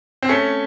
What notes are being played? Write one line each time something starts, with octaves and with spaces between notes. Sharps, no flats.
C4
A3 C#4